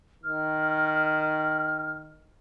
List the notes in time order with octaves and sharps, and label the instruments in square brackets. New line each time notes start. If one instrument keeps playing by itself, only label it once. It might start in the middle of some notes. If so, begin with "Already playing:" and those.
[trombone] D#3 [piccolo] F6